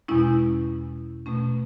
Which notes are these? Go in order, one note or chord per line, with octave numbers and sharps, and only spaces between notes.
E2 B2 G#3 C#4 E4
B2 A3 C#4